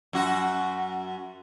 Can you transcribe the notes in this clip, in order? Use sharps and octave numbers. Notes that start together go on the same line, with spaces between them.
F#2 F#4